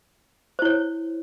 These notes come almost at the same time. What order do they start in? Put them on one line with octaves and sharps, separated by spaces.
C5 E4 C#5